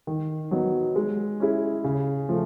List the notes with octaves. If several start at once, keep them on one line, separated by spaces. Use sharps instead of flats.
D#3
F#3 B3 D#4
G#3
C#4 E4 G#4
C#3
F3 A3